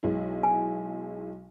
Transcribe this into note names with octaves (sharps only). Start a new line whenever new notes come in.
B1 G#3 E4
G#5